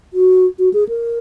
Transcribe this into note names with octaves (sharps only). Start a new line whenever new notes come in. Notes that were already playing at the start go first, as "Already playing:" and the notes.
F#4
F#4
G#4
A#4